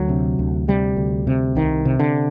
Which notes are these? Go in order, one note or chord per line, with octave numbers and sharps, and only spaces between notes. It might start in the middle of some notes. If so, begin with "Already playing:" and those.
Already playing: D2 F#3
C3
D2
C3 G3
D2
C3
C2 D#3
C3
D3